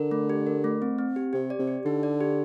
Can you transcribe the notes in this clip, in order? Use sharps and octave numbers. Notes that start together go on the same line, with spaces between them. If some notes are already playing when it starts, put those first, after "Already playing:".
Already playing: D3 A#4
A3
G4
A#4
A3
C4
C4
G4
C3 G4
D5
C3
G4
D3 D#4
D5
G4